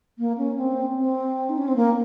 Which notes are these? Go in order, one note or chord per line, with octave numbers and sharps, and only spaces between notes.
A#3
C#4
C4
C4
D#4
C#4
C4
A#3